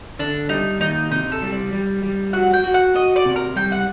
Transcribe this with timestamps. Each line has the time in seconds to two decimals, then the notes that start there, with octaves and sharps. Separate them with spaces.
0.19 D3 D4
0.49 G3 D#4
0.80 D#2 D#4
1.11 C3 D#4
1.32 A4
1.42 G3
1.52 D5
1.73 G3
2.03 G3
2.33 F#4 F#5
2.53 G5
2.64 F#4
2.74 F#5
2.95 F#4 D#5
3.16 D5
3.25 C3
3.36 A#4
3.56 G3 G5
3.72 F#5